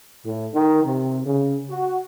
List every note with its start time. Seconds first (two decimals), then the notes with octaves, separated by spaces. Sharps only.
0.24 A2
0.54 D#3
0.84 C3
1.26 C#3
1.69 F#4